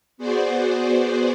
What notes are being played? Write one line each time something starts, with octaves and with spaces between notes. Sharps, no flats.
B3 F#4 G#4 C5 D5